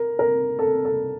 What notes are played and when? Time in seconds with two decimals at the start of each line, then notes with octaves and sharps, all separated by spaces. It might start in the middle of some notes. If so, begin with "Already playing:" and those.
Already playing: A#4
0.19 A#4
0.59 A4
0.85 A4